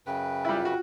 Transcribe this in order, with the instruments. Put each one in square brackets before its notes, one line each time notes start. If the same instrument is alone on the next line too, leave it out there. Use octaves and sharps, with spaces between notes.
[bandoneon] F#2 C#3 B4 [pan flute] G5
[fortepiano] G3 E4 [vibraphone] F4
[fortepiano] F#4